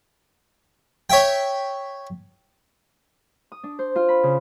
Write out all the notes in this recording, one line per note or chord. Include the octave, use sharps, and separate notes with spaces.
C#5 E5 G5
D#6
D4
C5
F4
B5
C#3